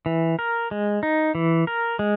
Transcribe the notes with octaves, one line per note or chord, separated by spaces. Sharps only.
E3
A#4
G#3
D#4
E3
A#4
G#3